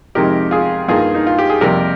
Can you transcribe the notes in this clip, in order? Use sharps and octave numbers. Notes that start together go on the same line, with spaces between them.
F2 C3 D#3 G#3 G4 A#4
F4 G#4
G2 D#3 A#3 F4 G#4
D#4
F4
G4
G#4
F2 C3 G3 A#3 G4 A#4